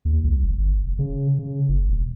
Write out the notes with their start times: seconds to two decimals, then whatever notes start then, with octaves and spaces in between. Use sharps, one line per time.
0.05 D#2
0.24 C2
0.43 F1
0.58 G1
0.83 F1
0.99 C#3
1.39 C#3
1.69 F#1
1.89 E1